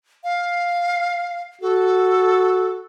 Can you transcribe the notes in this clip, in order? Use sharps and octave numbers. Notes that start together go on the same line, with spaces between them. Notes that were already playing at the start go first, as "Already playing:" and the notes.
F5
F#4 A4